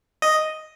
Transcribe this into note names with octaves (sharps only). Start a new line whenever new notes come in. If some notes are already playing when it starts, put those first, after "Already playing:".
D#5